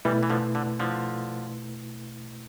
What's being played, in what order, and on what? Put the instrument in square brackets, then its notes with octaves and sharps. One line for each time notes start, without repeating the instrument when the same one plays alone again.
[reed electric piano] B2 A3 E4 B4 [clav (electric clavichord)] E3 G3
[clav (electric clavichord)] E3
D3 F3
D3
D3 F3